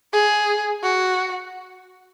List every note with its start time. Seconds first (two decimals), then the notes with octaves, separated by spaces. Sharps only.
0.13 G#4
0.83 F#4